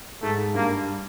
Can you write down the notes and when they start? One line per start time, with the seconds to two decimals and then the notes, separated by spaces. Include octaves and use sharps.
0.22 G#2 A3
0.55 G2 A#3